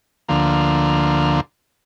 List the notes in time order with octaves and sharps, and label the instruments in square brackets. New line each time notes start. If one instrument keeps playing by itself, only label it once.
[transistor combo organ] D2 D3 F3 A#3